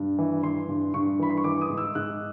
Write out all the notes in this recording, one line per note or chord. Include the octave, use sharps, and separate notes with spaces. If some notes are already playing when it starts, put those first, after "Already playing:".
Already playing: G2
E3
E3 C6
G2
G2 C#6
E3 B5
C6
C#6
E3 D6
D#6
G#2
E6
G#2 F#6